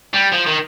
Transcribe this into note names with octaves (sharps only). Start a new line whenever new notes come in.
G3
F3
D#3